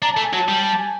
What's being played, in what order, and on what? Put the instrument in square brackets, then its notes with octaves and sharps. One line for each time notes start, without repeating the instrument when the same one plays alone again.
[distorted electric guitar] D4 [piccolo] A#5
[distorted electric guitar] A3 [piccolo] A5
[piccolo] G#5
[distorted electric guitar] F#3 [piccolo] A5
[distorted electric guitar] G3
[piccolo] A5
G#5